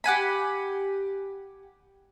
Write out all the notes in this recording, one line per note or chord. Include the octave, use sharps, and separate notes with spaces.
G4 F#5 G#5 B5